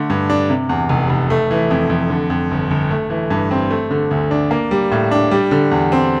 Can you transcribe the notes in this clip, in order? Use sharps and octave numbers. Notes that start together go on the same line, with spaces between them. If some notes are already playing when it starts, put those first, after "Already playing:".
Already playing: D3 A3
G2
D4
C3
E2
F1
F1
A3
E3
F2
F2
D3
F2
G1
G1
A3
E3
G2
C4
A3
D3
D2
D4
A#3
G3
A2
D4
G3
D3
E2
C4